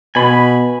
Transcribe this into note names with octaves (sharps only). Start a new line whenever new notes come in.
B2 G#5 B5